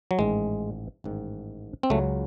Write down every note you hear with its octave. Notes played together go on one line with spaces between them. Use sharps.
F#3
A1 G#2 D#3 G#3
A1 G#2 D#3
C4
C#2 C#3 F#3 A3